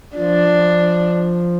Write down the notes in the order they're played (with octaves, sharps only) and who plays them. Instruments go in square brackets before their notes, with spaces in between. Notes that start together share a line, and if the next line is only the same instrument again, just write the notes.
[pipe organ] F3 [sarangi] D4
[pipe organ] F3